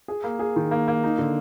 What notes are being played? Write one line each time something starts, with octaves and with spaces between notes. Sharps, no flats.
G#4
A#3
G#4
D#3
A#3
A#3
D#4
D3